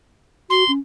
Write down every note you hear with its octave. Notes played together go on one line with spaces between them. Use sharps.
F#4 C6
C#4